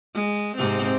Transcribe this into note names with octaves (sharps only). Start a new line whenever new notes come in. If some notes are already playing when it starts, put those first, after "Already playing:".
G#3
G#2 C3 C4